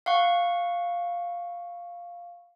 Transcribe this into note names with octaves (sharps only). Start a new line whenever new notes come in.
F5 F#5 C#6